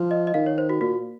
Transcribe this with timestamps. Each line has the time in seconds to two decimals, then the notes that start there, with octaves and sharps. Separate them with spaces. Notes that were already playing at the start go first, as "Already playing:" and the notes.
Already playing: F3
0.11 D#5
0.27 D#5
0.34 D#3 F5
0.46 C#5
0.58 C5
0.69 F#4
0.81 A#2 F#4